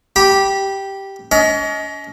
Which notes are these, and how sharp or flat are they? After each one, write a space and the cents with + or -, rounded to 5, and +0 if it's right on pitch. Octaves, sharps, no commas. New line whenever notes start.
G4 -5 B5 -25
C#4 +40 D#5 +20